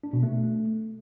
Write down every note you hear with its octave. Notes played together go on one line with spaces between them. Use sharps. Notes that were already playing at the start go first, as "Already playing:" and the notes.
D4
B2
A3